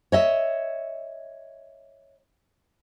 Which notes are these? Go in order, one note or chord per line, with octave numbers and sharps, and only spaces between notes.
C#5 D#5 E5